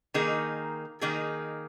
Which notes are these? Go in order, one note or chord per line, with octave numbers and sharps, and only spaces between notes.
D#3 A#3 D#4 G#4
D#3 A#3 D#4 G#4